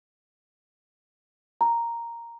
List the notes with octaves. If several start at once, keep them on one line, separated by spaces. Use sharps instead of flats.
A#5